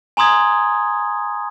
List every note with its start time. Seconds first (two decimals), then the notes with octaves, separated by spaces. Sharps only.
0.17 G#5 A#5 C6 D#6 G#6